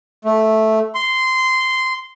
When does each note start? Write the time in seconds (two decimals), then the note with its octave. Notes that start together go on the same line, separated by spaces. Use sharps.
0.25 A3
0.95 C6